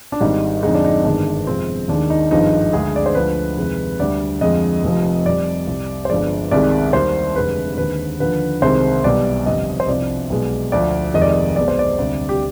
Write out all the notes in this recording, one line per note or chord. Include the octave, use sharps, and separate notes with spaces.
D4
G#1 G#2 G3 D#4
F2 D3 G#3 D#4
D4
D#4
G1 G2 D#3 G#3 D4
F2 C3 F3 G#3 C4
D#2 D#3 G#3 D4
D#4
G#1 G2 F3 G#3 D#4
D2 D3 G#3 G#4
D5
C5
D2 D3 F3 G#3 B4
F2 C3 D#3 G#3
D2 D3 G3 D5
F2 D3 F3 G#3 D#5
F1 F2 C3 F3
F2 C3 G3 D5
C2 C3 G3
C5
G1 G2 F3 G#3 D5
C2 C3 D#3 G#3 D5
D#2 D#3 G3 C5
F1 F2 D3 G#3 B4
D#2 D3 G#3 B4
D#2 D3 F3 B4
C2 C3 D#3 G#3 C5
B1 B2 G3 D5
G1 F2 C3 G3 D#5
C5
C2 C3 F3 D5
B1 B2 G#3
D2 D3 F3 D5
F1 F2 C3 D#3 G#3 D#5
D5
D#5
B1 B2 G#3 D5
C5
D5
D2 C3 G3
G4